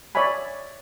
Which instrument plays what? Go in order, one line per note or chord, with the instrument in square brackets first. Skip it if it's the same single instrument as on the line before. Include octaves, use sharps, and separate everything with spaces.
[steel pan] C#5 D5 E5 G#5 B5